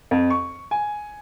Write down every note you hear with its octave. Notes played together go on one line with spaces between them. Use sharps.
F2
C#6
G#5